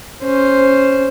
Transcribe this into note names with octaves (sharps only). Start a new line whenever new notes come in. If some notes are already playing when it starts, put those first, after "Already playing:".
C#4 C5